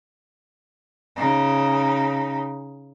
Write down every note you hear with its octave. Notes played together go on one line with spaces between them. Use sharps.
C#3 D#4